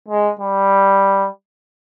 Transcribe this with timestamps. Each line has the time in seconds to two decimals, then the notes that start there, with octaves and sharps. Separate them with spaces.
0.09 G#3
0.40 G3